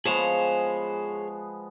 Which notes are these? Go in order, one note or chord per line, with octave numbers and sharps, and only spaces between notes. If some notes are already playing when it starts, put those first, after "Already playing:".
F3 G#3 B3 G#4 C5 C#5